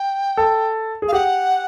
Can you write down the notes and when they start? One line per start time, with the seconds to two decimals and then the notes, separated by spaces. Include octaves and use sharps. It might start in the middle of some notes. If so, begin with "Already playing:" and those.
Already playing: G5
0.37 A4
1.02 G#4
1.08 F5
1.13 G4 F#5